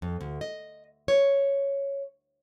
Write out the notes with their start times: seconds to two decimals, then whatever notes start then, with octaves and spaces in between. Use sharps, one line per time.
0.02 F2
0.21 D2
0.41 D#5
1.08 C#5